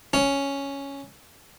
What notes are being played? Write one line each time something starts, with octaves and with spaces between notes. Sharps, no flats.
C#4